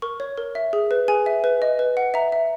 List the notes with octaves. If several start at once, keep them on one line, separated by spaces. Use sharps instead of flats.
A#4 C#6
C#5
A#4
E5
G#4
B4
G#4 G#5
E5
B4
D#5
B4
F#5
E5 A#5
E5